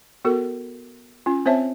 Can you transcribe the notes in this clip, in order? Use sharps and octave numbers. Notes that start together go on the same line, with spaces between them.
B3 F#4 A4 A#4
C#4 F4
C4 C5 C#5 E5 A5